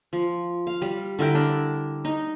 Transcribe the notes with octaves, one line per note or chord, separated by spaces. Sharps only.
F3
F5
G3
D3 E4 A#4 G5
D4
D#4